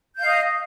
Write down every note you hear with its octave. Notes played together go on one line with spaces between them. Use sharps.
D#5 F5 G6